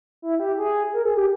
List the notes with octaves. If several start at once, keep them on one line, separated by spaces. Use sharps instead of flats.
E4
G4
G#4
A#4
G#4
G4